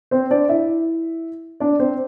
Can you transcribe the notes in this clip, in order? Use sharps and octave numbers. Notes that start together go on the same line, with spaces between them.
C4 C5
D4 D5
E4 E5
D4 D5
C4 C5